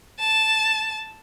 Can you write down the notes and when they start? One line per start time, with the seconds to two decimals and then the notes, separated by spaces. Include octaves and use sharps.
0.20 A5